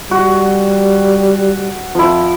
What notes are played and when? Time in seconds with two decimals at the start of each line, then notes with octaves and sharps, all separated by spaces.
0.11 G3 F#4
1.95 F2 F3 E4